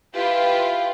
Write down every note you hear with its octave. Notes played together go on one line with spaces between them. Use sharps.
E4 F4 G4 B4